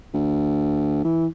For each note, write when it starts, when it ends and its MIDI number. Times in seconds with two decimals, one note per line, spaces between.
0.14 1.00 38
1.05 1.26 52